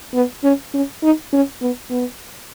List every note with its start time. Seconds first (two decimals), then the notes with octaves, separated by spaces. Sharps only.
0.14 B3
0.43 C#4
0.74 C#4
1.03 D#4
1.33 C#4
1.61 B3
1.91 B3